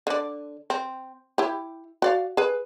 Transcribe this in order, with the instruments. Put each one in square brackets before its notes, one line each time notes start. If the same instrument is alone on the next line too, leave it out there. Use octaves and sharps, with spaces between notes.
[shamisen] D3 D5
C4
E4 G4
F#4 D5 F5
G#4 B4